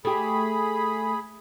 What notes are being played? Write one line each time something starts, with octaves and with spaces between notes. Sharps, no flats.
A3 G4 G#4 B5